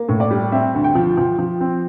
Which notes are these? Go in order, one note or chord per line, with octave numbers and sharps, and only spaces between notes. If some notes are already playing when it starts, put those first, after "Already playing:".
Already playing: A#3
A2
D5
G3
C4 E5
D2
G5
F3
F3
F3
C4